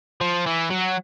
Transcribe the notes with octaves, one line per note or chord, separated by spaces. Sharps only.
F3
E3
F#3